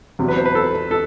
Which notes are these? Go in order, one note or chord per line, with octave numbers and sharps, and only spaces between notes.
E2 C3 F#3
B4
C5
B4
A4
A4